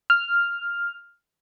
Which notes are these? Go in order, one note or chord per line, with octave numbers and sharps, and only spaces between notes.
F6